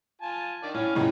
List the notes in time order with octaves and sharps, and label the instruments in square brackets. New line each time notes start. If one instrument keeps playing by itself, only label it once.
[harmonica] F4 G#5 A5
D#3 D4 D5
[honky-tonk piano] A2 [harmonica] C#4 D4 F5
[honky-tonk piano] F2 A2 C#3 [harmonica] C#4 D#4 F#4